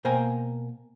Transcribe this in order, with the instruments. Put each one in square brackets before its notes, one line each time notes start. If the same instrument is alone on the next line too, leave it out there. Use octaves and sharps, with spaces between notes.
[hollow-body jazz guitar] B2 A#3 C5 G5 G#5 A#5